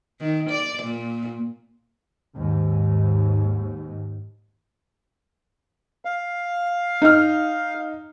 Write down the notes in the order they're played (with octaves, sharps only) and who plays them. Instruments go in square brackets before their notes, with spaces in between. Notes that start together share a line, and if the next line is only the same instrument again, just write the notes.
[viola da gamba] D#3
D5
A#2
[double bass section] D#2 G#2
[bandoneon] F5
[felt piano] D#4 F6